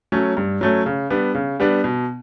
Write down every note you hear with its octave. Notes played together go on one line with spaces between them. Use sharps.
F#3 A3 C#4
G2
F#3 A3 C#4
C#3
G3 B3 D4
C#3
G3 B3 D4
B2